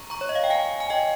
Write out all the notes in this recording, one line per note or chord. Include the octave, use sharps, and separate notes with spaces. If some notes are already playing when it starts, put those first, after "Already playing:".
Already playing: A#5 C#6
A#5 C#6
C#5
D#5
F5
G5
F5 G#5
G#5
D#5 G5